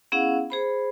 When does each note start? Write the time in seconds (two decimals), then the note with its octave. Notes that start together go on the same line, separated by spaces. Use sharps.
0.12 B3 C#4 E4 G#4 F5 F#5
0.50 G#4 C5 B5